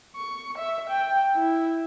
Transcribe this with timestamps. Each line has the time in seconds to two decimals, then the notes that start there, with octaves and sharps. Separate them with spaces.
0.16 C#6
0.58 E5
0.90 G5
1.35 E4